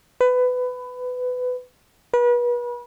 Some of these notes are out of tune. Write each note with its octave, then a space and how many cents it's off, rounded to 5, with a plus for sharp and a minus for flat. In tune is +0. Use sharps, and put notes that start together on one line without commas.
B4 +20
B4 -35